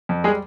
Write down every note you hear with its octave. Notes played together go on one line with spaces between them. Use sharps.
F2
G3 G#3 G#4